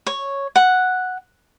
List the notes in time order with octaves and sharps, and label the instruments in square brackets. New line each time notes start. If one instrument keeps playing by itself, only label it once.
[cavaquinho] C#5
F#5